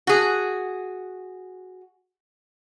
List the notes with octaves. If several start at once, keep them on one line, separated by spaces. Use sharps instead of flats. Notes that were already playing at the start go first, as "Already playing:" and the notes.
F#4 G#4